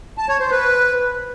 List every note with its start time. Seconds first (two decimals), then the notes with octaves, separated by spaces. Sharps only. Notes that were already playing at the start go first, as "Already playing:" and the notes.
0.18 A5
0.29 C#5
0.40 C5
0.51 B4